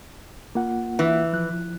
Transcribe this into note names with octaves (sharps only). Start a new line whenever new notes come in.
A#3 F4 F#5
E3
F3 F#6